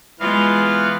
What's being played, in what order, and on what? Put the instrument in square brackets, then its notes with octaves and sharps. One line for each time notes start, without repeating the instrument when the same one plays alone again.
[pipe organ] E3 B3 F5 [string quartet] G#3 F4